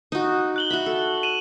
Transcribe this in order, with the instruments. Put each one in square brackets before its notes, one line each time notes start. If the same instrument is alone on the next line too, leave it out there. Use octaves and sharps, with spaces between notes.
[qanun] D#4 F#4
[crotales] F#6 F#7 G7
[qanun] F#4 E5 B5
A4
[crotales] D#7 E7 F#7